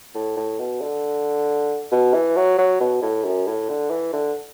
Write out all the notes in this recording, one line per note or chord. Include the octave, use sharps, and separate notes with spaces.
A2
A2
B2
D3
B2
E3
F#3
F#3
B2
A2
F#2
A2
D3
E3
D3